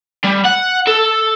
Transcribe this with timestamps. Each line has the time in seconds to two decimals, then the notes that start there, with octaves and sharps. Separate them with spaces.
0.25 G3
0.45 F#5
0.87 A4